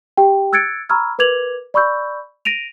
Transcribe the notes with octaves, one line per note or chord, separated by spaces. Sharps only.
G4 G5
E6 F#6 G#6 A6 C#7 D7
A#5 B5 C#6 E6 F6 G#6
A#4 B4 D6 G#6 F7 F#7
D5 B5 C#6 E6 G6
A#6 D7 D#7 F7